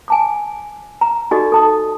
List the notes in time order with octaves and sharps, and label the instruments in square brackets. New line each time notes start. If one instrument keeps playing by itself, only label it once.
[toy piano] G#5 A5 D6
A#5
D#4 F#4 G4 A4 D5 D#5
A4 A5 D#6